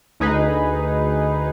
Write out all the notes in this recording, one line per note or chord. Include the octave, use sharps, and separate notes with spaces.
D2 D#4 G#4 B4